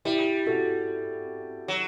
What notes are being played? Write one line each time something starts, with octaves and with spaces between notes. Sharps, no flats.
G3 E4 G4
F#4 A4
F#3